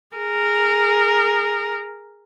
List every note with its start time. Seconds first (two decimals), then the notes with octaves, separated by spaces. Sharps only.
0.17 G#4 A#4